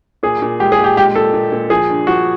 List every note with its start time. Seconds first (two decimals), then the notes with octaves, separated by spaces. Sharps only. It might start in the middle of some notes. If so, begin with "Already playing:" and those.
0.23 A#2 G#4
0.42 A#2
0.60 G#3 G4
0.72 G#4
0.78 A#2
0.84 G4
0.96 G#3 G4
1.15 A#2 A4
1.33 A#2
1.52 A#2
1.70 F3 G#4
1.89 G2
2.07 F3 F#4